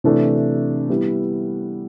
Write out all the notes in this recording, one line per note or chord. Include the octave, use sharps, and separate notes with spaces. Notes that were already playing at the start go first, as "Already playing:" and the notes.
C3 E3 A3 D4
G3 B3 E4